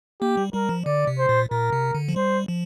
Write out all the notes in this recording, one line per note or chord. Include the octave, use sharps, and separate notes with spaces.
A#3 G4
G3
G3 A#4
F3
D3 D5
C3
C5
A#2
A#2 A#4
C3
D3
F3
G3 C5
F3